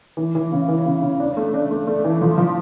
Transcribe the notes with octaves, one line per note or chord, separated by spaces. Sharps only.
E3
E3
C#3
E3
C#3
C#3
D4
A3
D4
A3
A3
E3
F3
F3